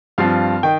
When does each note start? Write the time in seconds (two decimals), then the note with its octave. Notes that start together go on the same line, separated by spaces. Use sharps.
0.18 G2 F3 C4 F4 F5
0.63 D#3 G5